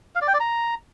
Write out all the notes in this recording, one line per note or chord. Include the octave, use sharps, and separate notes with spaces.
F5
D5
G5
D5
A#5